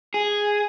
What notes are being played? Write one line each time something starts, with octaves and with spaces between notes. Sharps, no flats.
G#4